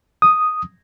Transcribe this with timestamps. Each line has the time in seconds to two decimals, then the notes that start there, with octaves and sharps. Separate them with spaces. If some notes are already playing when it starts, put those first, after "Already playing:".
0.22 D#6